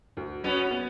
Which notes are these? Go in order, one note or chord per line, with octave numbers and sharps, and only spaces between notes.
D2
F#3 B3 C#4
B3